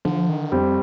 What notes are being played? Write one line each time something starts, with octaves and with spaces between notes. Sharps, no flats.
D3 F3
D#3
F2 G3 C4